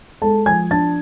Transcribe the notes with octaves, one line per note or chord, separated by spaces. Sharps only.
G#3 A4 A5
F3 G#5 G#6
D4 A5 A6